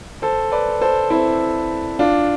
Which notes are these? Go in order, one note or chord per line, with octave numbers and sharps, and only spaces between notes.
A4 C5
B4 D5
A4 C5
C4 E4
D4 F4